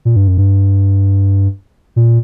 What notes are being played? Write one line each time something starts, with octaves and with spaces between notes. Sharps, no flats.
A#2
G2
F#2
G2
A#2